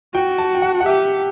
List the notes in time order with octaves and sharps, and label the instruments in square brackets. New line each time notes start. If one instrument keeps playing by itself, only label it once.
[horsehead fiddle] F#4 [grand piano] G5
[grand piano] A5
G5
F#5
F#5
[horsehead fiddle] G4 [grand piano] E5